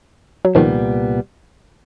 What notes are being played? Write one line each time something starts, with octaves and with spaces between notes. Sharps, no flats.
F#3
C2 A#2 D#3 F3 G3 B3